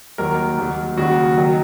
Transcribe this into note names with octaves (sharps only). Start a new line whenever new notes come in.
D#2 D#3 F#3 A#4
D#2 D#3 F#3
D#2 C#3 F#3 F#4
D#3 F#3